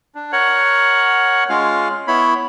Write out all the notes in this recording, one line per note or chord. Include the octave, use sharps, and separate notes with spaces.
D4
A#4 C#5 F#5
G#3 C#4 F4 F5
B3 E4 C#5 B5